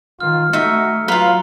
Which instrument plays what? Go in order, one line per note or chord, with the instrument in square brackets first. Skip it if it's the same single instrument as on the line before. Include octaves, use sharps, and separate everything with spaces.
[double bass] D#3 [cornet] F4 [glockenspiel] F6
[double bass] A3 [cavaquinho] D#4 E5 [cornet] F#4 [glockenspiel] C#7
[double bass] F#3 [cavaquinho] F4 B4 [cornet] F5 [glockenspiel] A#5 G7